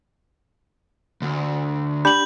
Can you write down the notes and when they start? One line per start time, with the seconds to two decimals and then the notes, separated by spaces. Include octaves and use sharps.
1.22 D2
2.05 D4 G4 B5 G6 F#7